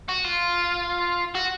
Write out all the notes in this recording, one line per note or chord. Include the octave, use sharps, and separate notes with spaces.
F#4
F4
F#4